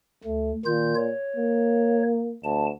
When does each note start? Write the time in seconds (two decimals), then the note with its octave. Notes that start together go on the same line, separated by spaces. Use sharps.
0.24 D2 A3
0.65 A#2 D#3 F4 G6
0.95 C#5
1.36 A#3
2.44 D2 A5